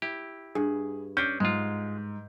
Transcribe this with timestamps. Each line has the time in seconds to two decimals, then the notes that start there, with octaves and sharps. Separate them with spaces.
0.02 E4 G4
0.55 G2 G#4
1.17 C#4 D4 G6
1.40 G#2 G#3 F4